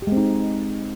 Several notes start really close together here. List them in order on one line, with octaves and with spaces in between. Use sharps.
G4 G#3 C4 D#4